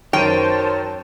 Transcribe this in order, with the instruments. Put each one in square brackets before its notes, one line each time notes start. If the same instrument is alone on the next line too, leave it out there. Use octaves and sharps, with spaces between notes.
[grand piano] F#2 D#3 D#7 [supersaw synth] C5 A5 [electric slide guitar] C#5 [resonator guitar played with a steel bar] G5